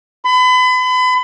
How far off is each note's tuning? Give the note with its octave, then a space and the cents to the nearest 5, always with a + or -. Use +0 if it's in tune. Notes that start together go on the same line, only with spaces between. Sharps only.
B5 +35